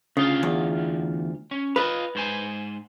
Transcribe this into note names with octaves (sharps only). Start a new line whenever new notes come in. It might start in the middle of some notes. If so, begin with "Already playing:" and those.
D2 C#3 F4 F5
E2
C#4
F4 B4 D#5 F5
G#2 C5 G#5